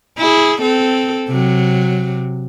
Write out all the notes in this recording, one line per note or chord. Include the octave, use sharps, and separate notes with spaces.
E4 G#4
C4 A4
C3 F#3